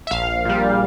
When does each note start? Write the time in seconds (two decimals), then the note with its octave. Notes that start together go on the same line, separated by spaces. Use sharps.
0.07 E5
0.11 A#1 F5
0.45 A#2 G3